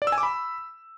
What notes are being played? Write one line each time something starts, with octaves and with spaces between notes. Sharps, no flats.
D5
E6
G#5
D6
B5